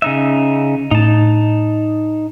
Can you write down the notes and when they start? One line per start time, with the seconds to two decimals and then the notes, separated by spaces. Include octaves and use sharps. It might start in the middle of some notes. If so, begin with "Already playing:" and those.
0.02 C#3 D#4 E5
0.91 A2 D#4 A5